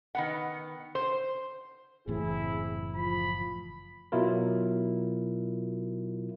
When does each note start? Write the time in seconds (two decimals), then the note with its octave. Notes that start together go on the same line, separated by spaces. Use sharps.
0.15 D#3 B3 F#5
0.95 C5
2.08 F#1 A2 E3 C4 E4 G#4
2.96 F3 B5
4.12 B2 F#3 E4 F4 A#4